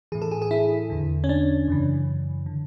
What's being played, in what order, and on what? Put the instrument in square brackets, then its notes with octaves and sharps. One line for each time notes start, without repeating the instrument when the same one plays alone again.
[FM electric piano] E3 G#4
A2
A4
G#4
G#4
E4
E2 D3
C#4
D4
F#2 C#3 E3
D3